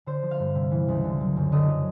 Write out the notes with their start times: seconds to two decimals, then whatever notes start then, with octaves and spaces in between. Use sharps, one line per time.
0.06 D3 C5
0.23 F3
0.31 F5
0.39 G2
0.55 C3
0.71 E3
0.88 C#2
1.04 D3
1.21 F#3
1.36 F#2
1.52 D3 D#5
1.68 F#3